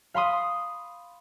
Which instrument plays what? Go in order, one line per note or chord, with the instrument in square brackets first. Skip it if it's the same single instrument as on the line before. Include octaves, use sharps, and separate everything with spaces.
[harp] F5 B5 C6 D#6